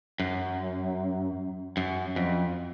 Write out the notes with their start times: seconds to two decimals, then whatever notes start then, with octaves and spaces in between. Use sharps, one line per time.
0.20 F#2
1.77 F#2
2.16 F2